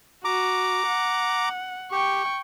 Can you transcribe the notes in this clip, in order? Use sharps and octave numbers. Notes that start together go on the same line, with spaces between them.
F#4 A#5 D6
F#5
G4 G5 C#6